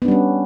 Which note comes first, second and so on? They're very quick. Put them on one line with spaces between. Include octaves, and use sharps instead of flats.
B3 D4 G3 C#4